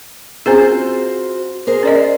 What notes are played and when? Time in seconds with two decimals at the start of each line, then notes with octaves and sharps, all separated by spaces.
0.46 C4 C#4 F4 F#4 G#4 C5
1.67 G#4 A#4 C5
1.83 C#4 D5 D#5